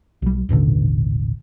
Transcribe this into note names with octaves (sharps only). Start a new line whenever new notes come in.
B1 G3
D#1 A1 B2 D3